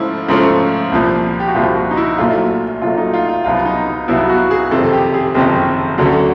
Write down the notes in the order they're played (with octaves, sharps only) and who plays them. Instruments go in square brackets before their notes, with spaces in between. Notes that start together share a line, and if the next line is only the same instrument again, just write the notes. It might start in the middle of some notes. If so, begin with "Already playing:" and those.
Already playing: [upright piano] G#2 F3 A3 C#4 E4 F4
G#2 F3 A3 C#4
C2 A#2 F3
G4
F#4
C2 A#2 F3 F4
F#4
D#4
E4
A#1 A#2 F#3 A3 F4
A#1 A#2 F#3 A3 F4
D#4
F4
F4
C2 B2 F#3 B3 F4
D#4
D#4
C2 B2 F#3 B3 E4
F#4
G#4
F#1 F2 C3 D#3 A4
G4
G#4
F#1 F2 C3 D#3 G4
D2 D3 F#3 A3 C#4